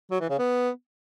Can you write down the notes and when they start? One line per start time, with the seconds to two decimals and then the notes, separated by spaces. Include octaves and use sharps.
0.11 F#3
0.21 E3
0.30 C#3
0.39 B3